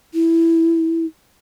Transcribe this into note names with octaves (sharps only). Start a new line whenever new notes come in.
E4